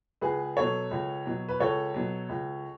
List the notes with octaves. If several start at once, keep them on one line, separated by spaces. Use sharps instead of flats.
C#2 G#4 B4
B2 F#3 A4 C#5
C#2
B2 F#3
B4
C#2 A4 C#5
B2 F#3
C#2